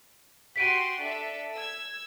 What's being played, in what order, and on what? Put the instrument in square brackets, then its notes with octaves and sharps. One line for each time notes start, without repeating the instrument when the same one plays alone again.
[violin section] F#4 G4 C6 [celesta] B6 D7 D#7
[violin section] D4 A4 E5
E6 G#6